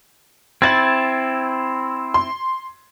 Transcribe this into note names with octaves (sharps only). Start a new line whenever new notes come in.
C4 E4 G#6 A6 F#7
C6